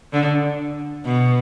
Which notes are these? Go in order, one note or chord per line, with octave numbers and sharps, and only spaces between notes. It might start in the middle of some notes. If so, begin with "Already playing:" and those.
D3
B2